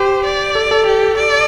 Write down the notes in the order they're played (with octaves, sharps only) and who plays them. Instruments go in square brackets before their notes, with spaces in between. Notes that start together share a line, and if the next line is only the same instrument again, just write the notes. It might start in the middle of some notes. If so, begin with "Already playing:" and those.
Already playing: [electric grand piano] G4 [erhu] C5
[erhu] D5
[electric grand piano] A4
A4
[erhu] G4
D5